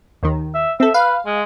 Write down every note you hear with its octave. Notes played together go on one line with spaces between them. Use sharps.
D#2 D#3
E5
C4 A4 E5
B4 F5
G#3